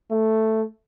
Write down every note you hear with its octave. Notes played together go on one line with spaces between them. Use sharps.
A3